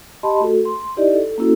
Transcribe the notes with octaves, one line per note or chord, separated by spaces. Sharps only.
G4 D#5 A5 B5 C6
A3 F#4 A4
C6
D#4 E4 G4 D5 D#5
A4
A#3 C#4 E4 F#4 A4